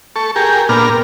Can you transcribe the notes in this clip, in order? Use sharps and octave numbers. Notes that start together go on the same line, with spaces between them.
A4 C#6
G4 G#4 A#4
A#2 B3 D4 A#4 F6